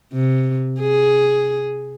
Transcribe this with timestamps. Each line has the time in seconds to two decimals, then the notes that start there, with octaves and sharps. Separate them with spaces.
0.13 C3
0.80 G#4